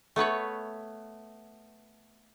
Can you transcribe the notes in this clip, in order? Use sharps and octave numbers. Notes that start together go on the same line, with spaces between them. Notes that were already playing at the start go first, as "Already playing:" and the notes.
A3 B3 B4 C#5